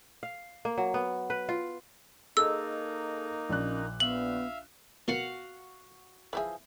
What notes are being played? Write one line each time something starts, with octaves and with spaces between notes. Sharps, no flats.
F5
A#3
F#3
B3
B4
F4
A#3 D#4 G#4 A4 D#5 E6
A#1 C#4 D5 F#6
B3 E5 F5 F#7
B2 A#3 F#4 F5 F#5
E3 F3 G#4 B4 E5